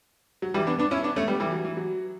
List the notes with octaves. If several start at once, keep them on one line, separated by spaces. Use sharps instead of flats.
F#3
E3 G3
B3 D4
B3 D4
C#4 E4
B3 D4
A3 C#4
G3 B3
E3 G3
F#3
E3
F#3